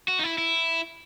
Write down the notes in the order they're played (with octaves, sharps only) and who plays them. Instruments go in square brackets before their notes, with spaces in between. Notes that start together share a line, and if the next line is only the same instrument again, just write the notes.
[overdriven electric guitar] F#4
D#4
E4
E4